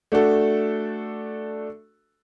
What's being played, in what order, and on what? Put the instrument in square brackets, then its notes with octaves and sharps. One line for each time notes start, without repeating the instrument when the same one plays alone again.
[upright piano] A3 D4 F#4 A4